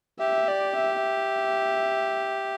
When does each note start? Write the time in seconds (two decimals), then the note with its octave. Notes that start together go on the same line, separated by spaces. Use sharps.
0.20 G4 E5
0.48 D5
0.76 E5
1.05 E5